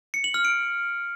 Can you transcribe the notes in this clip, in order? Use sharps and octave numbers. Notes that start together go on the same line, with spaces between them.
C#7
F#7
F6
D7